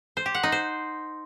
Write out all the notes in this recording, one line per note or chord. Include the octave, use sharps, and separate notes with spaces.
C5
G4
F#5
D#4
C5